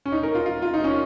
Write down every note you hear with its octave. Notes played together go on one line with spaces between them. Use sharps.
C#4
D#4
A#4
F4
F4
F4
D#4
C#4